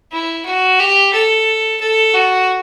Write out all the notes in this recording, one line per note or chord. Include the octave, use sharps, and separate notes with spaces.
E4
F#4
G4
A4
A4
F#4